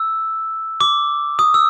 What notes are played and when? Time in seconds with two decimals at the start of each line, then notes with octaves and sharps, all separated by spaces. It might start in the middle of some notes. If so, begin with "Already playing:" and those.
Already playing: E6
0.81 D6
1.39 D#6
1.54 E6